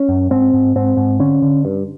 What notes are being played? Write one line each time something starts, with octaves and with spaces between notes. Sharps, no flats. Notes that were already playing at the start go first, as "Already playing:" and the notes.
Already playing: C#4
F#2
G#2 C4
G#2
G#2 C4
G#2
D3 C#4
D3
G2